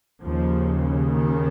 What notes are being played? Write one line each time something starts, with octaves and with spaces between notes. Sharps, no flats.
D#2 C#3 F3
D#3